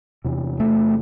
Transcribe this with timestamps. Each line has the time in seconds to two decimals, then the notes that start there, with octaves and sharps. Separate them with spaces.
0.24 E2 C3
0.60 A3